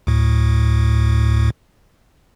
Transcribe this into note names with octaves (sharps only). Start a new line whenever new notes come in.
D2 A2